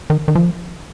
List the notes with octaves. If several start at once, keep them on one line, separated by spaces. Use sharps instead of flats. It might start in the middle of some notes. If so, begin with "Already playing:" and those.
D#3
D#3
F3